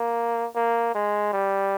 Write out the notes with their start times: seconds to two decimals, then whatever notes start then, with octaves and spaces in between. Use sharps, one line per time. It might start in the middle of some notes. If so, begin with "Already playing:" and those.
Already playing: A#3
0.55 A#3
0.95 G#3
1.33 G3